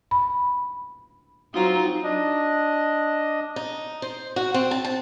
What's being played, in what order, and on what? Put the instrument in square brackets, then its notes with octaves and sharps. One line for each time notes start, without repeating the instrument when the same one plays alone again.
[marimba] B5
[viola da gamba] F#3 C4 F4 [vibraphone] D#4 A#5
[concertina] D4 D#5
[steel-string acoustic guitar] D#4
C5
F#4
C4
A5
A5